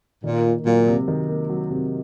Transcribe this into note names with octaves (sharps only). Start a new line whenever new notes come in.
A#2 D#3
A#3
A#2 F#3
C3
D#3
A#3
F#3
C3